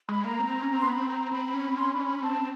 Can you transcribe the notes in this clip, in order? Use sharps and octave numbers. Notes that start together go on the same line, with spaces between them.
G#3 B5
A#3 A#5
C4
C#4
C4
C6
B3 B5
C4
A#5
C4 B5
C#4
C4
C#4 C6
D4 B5
C#4
B5
C4 A5